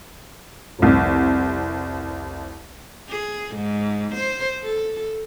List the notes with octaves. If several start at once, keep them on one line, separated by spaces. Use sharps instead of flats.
F1 C2
G#4
G#2
C5
A4